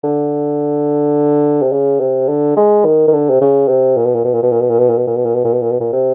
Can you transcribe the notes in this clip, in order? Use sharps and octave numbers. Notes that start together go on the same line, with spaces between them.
D3
C3
C#3
C3
D3
G#3
D#3
D#3
D3
C3
C#3
C3
A#2
B2
A#2
B2
A#2
B2
A#2
B2
A#2
B2
A#2
B2
A#2
B2
A#2
B2
A#2
B2
A#2
B2
A#2
C3